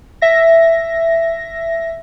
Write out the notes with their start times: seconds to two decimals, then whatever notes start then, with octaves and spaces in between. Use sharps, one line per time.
0.22 E5 A#6